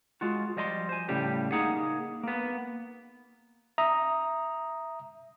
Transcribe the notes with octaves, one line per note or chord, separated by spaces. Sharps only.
G#3 F4 F#4
F3 G3 D#5 G#5 C6
C5 G#5
A2 C#3 G3 G4
A#3 D#4 G#4 F#5
A#3 B3
E5 A#5 D#6